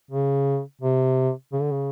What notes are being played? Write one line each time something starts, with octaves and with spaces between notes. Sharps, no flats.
C#3
C3
C#3
D3
C#3